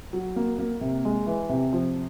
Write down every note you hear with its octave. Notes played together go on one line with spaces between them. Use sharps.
F#3
A#3
A#3
C3
G#3
E3
C3
F3